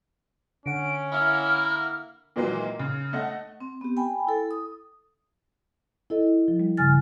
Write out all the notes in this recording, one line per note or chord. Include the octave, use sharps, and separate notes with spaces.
D3 C#4 F#5 D7
A#3 E4 F6
A#2 D#3 E3 F#3 G#3 A#3
C#3
A3 D#5 F#5
C4
B3 G4
G5 G#5 B5
E4 A4
D#6
E4 A4 D#5
F3
G3
G2 C#3 G#5 F6 A6